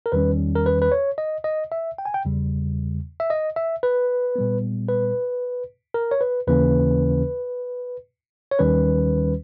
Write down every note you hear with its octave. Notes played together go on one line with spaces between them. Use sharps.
A#4
E2 D#3 G3 C#4 B4
A#4
B4
B4
C#5
D#5
D#5
E5
G5
G#5
G5
E2 C#3 G3
E5
D#5
E5
B4
A#2 G3 B3
B4
A#4
C#5
B4
D#2 C#3 E3 A#3 C#4 B4
C#5
D#2 D#3 G3 C#4 B4